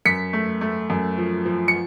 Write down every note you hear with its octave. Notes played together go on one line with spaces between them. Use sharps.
F#2 B6 C#7
A3
A3
F#2
F3
F3
C#7